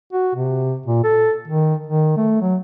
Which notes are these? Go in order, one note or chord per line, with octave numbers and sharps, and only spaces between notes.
F#4
C3
A#2
A4
D#3
D#3
A3
F#3